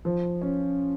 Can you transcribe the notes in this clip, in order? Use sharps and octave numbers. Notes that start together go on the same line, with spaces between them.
F3
C#4